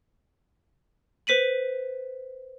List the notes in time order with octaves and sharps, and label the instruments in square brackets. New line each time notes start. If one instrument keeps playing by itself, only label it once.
[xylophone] B4 C5 B6 D#7 F#7